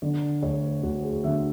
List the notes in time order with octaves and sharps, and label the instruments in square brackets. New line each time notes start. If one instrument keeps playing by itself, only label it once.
[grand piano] D3 D5
D2 C#5
D2 F#4
G#4
D3 E5